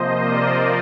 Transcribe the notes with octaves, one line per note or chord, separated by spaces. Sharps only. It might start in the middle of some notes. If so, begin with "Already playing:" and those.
Already playing: C3 F3 A#3 C5 D#5
A#4 D5